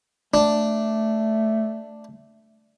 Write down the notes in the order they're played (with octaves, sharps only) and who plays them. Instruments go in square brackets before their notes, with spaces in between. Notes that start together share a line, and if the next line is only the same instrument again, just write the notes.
[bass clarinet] A3 [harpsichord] D4